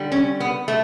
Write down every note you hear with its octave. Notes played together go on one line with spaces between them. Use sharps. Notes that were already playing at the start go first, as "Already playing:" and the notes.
Already playing: D3 G3
C#4
B3
A3